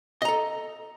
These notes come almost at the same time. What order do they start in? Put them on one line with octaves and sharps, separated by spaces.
D#5 A#5 A4